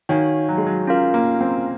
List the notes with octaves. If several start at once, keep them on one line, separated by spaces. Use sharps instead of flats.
D#3 F#4 C#5 F5 G#5
F#3
G#3
F#3
C#4 F4 A#4 F5
A#3
C4